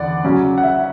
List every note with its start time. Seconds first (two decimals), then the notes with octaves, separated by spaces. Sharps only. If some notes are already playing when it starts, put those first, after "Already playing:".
Already playing: E2 D3 D5 F#5
0.24 C#3 F#3 C#4
0.58 F#5
0.63 E5